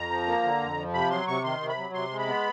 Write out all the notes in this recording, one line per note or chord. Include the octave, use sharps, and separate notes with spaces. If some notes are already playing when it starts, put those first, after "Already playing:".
Already playing: F2 A#5
F3
A#3
D3
F2
F3
C3 B5
F#3 C6
C3 C#6
D#3 C6
C3
B5
F#3
C3 C6
G#3
B5
B3